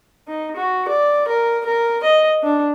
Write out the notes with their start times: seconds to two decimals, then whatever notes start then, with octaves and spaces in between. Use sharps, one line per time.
0.28 D#4
0.56 F#4
0.88 D5
1.28 A#4
1.66 A#4
2.03 D#5
2.43 D4